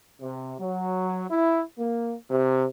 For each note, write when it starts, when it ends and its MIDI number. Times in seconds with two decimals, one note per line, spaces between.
0.21 0.54 48
0.60 1.25 54
1.30 1.61 64
1.78 2.15 58
2.30 2.65 48